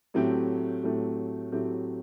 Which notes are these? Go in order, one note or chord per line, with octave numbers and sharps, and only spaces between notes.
A2 F#3 A3 C4 G4
A2 F#3 A3 C4 G4
A2 F#3 A3 C4 G4